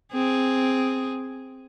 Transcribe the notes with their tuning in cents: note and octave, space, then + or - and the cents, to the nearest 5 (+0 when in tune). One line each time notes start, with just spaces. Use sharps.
C4 +0 G#4 +0